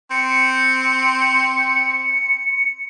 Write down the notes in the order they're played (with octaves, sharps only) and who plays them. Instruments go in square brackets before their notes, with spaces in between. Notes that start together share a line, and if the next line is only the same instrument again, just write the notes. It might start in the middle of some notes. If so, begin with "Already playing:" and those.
[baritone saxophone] C4 [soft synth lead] C#7